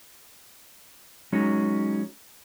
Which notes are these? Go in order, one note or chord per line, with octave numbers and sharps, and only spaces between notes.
F#3 G#3 C#4 D#4